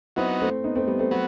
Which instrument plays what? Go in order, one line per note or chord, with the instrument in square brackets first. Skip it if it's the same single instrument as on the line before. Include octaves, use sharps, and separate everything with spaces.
[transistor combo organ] F#3 B3 D#4 [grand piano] C4 E4
[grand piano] A3 C4
B3 D#4
A3 C4
G3 B3
A3 C4
[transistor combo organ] F#3 B3